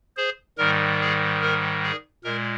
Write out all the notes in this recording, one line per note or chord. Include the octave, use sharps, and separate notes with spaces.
G#4 C5
G#2 D#3 G3 A#4
G#4
A#4
G#4
A#2 G#3 A#4